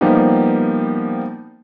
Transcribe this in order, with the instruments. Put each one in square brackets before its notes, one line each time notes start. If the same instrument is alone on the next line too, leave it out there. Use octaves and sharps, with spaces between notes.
[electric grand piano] F3 G3 A#3 B3 D#4 G4